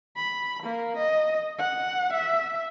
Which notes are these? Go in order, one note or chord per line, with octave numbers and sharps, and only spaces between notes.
B5
A#3
D#5
F#5
E5